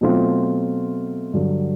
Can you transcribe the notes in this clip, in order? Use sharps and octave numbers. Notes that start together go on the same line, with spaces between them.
B2 F#3 A3 C4 F4
G2 D3 F#3